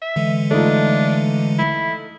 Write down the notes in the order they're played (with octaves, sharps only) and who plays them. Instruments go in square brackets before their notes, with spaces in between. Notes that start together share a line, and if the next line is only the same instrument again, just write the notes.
[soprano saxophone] E5
[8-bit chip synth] D3 E3 G#3
[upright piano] A3 D#4 F4 [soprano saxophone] D4
[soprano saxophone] E4